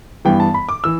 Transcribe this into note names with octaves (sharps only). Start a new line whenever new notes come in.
G2 E3 B3 G5
A5
B5
D6
E3 E6